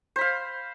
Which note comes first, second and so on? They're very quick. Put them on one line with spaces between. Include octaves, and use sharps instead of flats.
C5 B5 F5